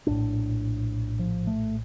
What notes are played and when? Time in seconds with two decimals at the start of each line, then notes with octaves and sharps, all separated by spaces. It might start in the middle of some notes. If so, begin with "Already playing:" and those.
0.07 A#1 A2 D4
1.19 F3
1.47 A3